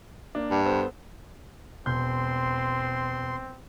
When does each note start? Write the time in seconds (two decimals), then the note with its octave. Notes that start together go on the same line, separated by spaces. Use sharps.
0.35 A#3 D4
0.51 G2
0.66 B3 A4 C5
1.86 E1 C4 C6 G6